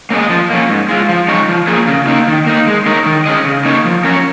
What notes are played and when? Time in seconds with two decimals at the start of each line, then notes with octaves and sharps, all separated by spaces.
0.10 A#3 C#4 G#4 D#5
0.30 F3
0.50 A#3 C#4
0.70 G#2
0.89 G#3 F4
1.09 F3
1.28 G#3 D#4 C#5
1.48 F3
1.67 A#3 F4 G#4
1.87 C#3
2.07 A#3 D#4
2.28 D#3
2.46 A#3 D#4
2.67 G#3
2.86 D#4 A#4 C#5
3.06 D#3
3.26 C#4 G#4 D#5
3.45 C#3
3.65 A#3 D#4 C#5
3.85 F3
4.04 C#4 A#4 C#5